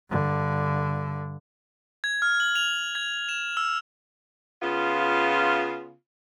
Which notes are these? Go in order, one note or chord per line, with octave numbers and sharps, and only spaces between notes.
G2 D3
G#6
F6
F#7
F7
G#6
E7
E6
C#3 B3 F4